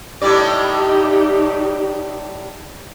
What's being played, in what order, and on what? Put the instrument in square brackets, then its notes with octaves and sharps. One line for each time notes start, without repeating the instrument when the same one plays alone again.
[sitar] A2 G3 D5 [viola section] D#4 G4